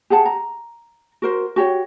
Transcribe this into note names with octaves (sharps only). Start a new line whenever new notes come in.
G4 G#4 F#5 A5
A#5
F#4 A#4 C5
F#4 G4 C#5